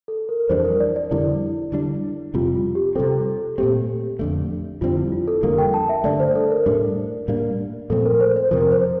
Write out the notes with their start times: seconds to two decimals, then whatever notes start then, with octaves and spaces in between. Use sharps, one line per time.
0.08 A4
0.29 A#4
0.49 F2 E3 G3 D4 C5
0.64 A#4
0.80 D5
0.96 D5
1.11 F2 D3 G3 E4
1.72 D3 G3 D4
2.34 F2 C3 G3 F4
2.55 F4
2.75 G4
2.95 C3 G3 C4 A4
3.58 A#2 A3 C4 G4
4.19 F2 D3 A3
4.81 F2 D3 G3 C4 F4
4.97 E4
5.12 F4
5.28 A4
5.43 F2 D3 G3 A#3 A#4
5.58 G5
5.74 A5
5.89 E5
6.04 G2 D3 A3 D5
6.20 C5
6.35 A4
6.51 A#4
6.66 A2 G3 D4
7.28 A2 G3 A#3 D4
7.90 A#2 F3 A3 C4 A4
8.05 A#4
8.20 C5
8.36 C5
8.51 F2 C3 F3 A#4
8.72 C5